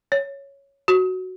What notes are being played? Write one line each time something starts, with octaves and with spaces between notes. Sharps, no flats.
C#5
F#4